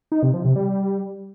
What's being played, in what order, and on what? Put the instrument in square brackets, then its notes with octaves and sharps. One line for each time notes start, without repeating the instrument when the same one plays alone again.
[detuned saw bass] D#4
C3
F3
C3
G3